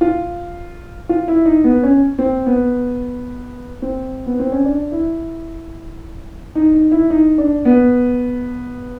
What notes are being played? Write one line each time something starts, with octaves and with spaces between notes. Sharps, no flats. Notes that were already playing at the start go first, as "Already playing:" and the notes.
F4
F4
E4
D#4
B3
C#4
C4
B3
C4
B3
C4
C#4
D4
E4
D#4
D#4
E4
D#4
D4
B3